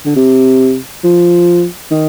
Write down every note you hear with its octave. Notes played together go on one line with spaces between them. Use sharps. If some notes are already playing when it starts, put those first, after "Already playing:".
D3
C3
F3
D#3